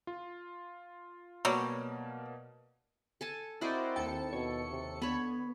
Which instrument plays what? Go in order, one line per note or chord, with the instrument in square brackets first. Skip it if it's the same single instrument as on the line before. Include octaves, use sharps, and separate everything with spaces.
[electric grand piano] F4
[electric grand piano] B2 A#3 [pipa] F#3 G3
[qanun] A4 G#5 A5
[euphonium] C4 [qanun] E4 A#4 D#5 [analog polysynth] F#4 C5 D5
[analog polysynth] D#2 A4 C#7 [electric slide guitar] G5
[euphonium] B2 [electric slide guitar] C#5
[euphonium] C3
[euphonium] D3 [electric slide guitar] B3 [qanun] C#5 B5